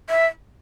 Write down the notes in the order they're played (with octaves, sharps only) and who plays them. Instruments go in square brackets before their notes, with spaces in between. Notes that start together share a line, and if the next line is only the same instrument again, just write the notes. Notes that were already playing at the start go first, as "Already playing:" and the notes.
[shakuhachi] E5